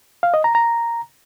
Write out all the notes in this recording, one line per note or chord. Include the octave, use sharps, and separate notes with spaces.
F5
D#5
A#5
A#5